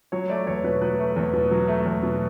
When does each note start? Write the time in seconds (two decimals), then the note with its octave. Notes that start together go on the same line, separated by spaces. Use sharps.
0.12 F#3 C#5
0.29 A3 D5
0.47 E2 C#5
0.64 B2 B4
0.82 F#3 B4
0.99 A3
1.16 E2
1.33 B2
1.51 F#3
1.68 A3
1.85 E2
2.03 B2